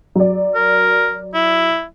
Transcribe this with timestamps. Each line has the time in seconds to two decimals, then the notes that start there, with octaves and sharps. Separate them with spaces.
0.15 F#3 D5
0.55 A#4
1.34 E4